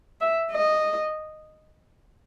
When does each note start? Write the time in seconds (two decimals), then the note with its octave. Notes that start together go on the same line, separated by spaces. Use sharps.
0.21 E5
0.52 D#5